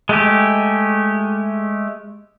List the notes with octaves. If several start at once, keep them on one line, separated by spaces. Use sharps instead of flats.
G#3 A3 G4